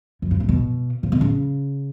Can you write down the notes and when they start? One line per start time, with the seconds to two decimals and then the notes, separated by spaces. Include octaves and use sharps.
0.22 F#2
0.31 G2
0.40 G#2
0.49 B2
1.03 A#2
1.12 B2
1.21 C#3